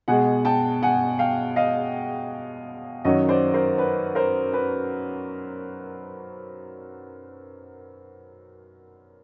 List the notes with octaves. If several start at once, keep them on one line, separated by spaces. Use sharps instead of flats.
B2 G#3 F#5 G#5
G5 A5
F#5 G#5
F5 G5
D#5 F5
F#2 D#3 F#3 C#5 D#5
C5 D5
A#4 C5
B4
A#4 C5
B4